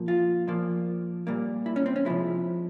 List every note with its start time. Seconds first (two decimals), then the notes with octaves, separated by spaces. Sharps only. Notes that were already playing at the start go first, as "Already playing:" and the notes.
Already playing: A#2 F3 A#3
0.08 F4
0.47 A#2 F3 A#3
1.27 A#2 G3 A#3
1.66 E4
1.76 C#4
1.86 C4
1.96 C#4
2.05 C3 F3 G#3 E4